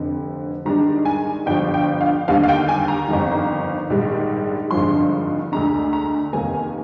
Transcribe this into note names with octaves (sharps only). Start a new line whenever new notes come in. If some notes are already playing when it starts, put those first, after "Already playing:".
Already playing: F1 F2 D3
G#2 D#3 G3 D4 A#5
G#5
G1 G2 D3 F3 G5
G5
F5
D#2 D3 G3 F5
F5
G5
G#5
A#5
G1 F2 D#3
A#1 G#2 D#3 G3
G#1 G2 D3 F3 G#3 C6
D2 D3 G#3 D4 A#5
A#5
F1 D#2 D#3 A#3 G#5